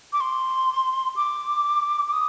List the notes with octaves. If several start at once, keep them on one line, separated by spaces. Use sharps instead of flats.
D6
C6
D6
D6
D#6